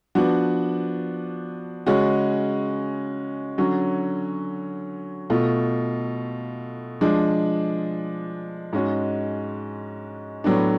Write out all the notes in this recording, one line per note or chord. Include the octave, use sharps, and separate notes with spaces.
F3 B3 D4 F#4
C#3 G#3 C#4 F#4
D3 F#3 C#4 F#4
B2 A3 F4
F3 G#3 D4
G#2 G#3 C#4 F#4
A2 F#3 B3 D4